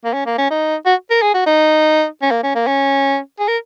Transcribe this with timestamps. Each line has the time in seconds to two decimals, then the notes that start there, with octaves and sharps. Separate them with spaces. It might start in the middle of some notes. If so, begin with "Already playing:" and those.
0.04 A#3
0.13 C#4
0.26 A#3
0.38 C#4
0.50 D#4
0.86 F#4
1.10 A#4
1.22 G#4
1.34 F#4
1.46 D#4
2.22 C#4
2.31 A#3
2.43 C#4
2.55 A#3
2.67 C#4
3.39 G#4
3.48 A#4